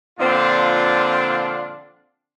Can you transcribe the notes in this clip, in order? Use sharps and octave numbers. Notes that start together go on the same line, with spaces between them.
A#2 D3 F3 C4 D4 F4